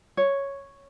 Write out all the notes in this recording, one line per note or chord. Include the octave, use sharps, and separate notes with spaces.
C#5